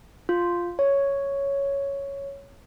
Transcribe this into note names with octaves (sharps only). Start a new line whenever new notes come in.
F4
C#5